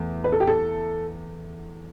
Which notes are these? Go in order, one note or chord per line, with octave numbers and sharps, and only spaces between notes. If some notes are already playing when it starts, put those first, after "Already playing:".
Already playing: E2 A3
B4
A4
G4
A4